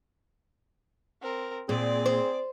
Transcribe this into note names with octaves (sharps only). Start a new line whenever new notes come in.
C4 A#4
A#2 C4 G#4 D5
C5